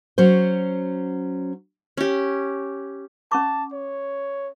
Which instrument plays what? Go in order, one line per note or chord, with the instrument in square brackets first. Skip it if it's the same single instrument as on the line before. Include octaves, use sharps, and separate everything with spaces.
[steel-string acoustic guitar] F#3 C#4 C5
[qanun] C#4 G4
[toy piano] C#4 C#6 D6 [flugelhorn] A5
[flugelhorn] C#5